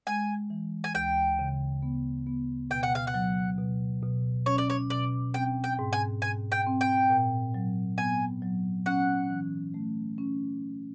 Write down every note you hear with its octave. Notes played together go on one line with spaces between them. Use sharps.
G#3 G#5
E3
G#5
D2 G5
C#3
B3
B3
B2 G5
F#5
F5
F#5
F#3
B2
B2
C#4 C#5
D5
C#5
B2 D5
C4 G5
G5
G#2
G#5
G#2 G#5
G5
C4
G5
A#2
F#3
B3 G#5
F#3
C#4 F#5
E3
A3
C#4